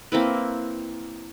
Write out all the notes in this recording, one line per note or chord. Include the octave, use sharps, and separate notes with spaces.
A#3 C4 E4 B4